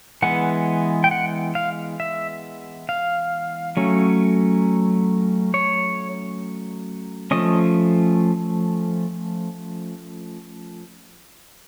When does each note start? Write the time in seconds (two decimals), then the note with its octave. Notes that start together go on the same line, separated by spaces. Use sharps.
0.22 E3 G#3 B3 F#5
1.04 G5
1.11 F#5
1.55 F5
2.00 E5
2.89 F5
3.77 F#3 A3 C#4
5.54 C#5
7.31 F3 A3 C#4 D#5